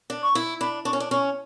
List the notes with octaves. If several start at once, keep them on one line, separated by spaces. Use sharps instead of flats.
D4
C#6
E4
D4 B5
D4 C#6
C#4
D4
C#4 C#6